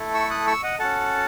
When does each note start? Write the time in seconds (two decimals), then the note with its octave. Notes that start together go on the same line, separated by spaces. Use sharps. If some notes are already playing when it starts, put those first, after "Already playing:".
Already playing: A3 E4 A4
0.14 C#6 E6
0.31 D#6 F#6
0.47 C#6 E6
0.63 D#5 F#5
0.79 C#4 F#4 A4 F#5 A5